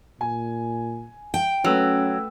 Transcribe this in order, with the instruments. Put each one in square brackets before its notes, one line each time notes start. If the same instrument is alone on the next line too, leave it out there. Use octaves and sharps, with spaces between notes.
[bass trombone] A#2 [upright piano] G#5
[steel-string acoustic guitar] G5
[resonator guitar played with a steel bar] F#3 [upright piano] A3 B4 E6 [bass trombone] C#4